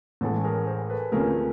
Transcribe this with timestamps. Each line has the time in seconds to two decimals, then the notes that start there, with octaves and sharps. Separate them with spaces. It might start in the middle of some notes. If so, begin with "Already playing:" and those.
0.21 A1 A2 E3 G#3 A4
0.44 G#4 A#4
0.67 A#4 C5
0.90 A4 B4
1.12 D2 C3 F3 A3 C#4 G#4 A#4